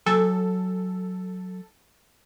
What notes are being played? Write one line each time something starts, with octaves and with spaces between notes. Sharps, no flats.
F#3 A4 G#5 A5